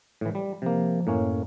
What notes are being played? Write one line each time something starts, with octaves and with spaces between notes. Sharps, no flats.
A2 E3
G3
C3 F3 A#3
F#2 A2 A#3 C#4